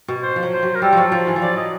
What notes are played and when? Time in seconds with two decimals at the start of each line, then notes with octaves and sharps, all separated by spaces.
0.08 B2
0.23 C5
0.36 F3
0.43 F#3
0.53 C5
0.63 F#3
0.75 A#4
0.82 G3 A4
0.93 F3 F#3
1.12 F3
1.27 E3
1.36 F3
1.42 F#3 D5
1.57 D#5